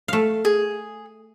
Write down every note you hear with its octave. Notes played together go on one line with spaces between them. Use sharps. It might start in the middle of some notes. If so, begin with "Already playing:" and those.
A3 F5
G#4